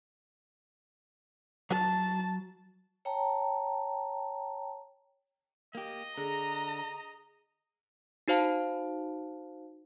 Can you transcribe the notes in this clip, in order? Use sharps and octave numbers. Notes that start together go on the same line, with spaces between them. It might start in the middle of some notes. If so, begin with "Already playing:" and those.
F#3 A5
C#5 G5 A5 A#5
A#3 G4 D#5
D3 G#4 A#5
D#4 F#4 C5 F5 A5